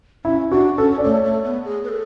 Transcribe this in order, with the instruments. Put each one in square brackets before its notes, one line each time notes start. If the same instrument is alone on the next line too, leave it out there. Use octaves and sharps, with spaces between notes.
[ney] C#4 [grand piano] E4
[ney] D4 [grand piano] F#4
[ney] C#4 [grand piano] A4
[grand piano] D5
[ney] A3 [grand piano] C#5
[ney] A3
B3
G#4
B4
A4